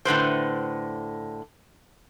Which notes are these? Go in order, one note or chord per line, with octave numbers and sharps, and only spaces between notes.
A2 D3 B4 C5